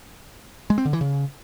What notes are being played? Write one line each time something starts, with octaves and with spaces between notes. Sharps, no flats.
G#3
C4
D3
E3
C#3